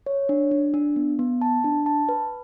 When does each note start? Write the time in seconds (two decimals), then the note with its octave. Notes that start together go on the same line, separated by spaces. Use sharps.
0.06 C#5
0.29 D4
0.51 D4
0.74 D4
0.96 B3
1.19 B3
1.41 A5
1.64 D4
1.86 A5
2.09 B4